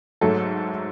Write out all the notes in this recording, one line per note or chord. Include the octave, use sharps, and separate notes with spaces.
G#2 F#3 A3 A4